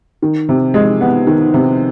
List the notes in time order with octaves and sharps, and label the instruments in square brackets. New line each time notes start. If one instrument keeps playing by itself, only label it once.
[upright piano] D#3
C3
G#3
B3
D#3
C3